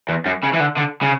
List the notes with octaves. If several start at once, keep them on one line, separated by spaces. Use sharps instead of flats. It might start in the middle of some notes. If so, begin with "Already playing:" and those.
E2
F#2
C#3
E3
D3
D3
C#3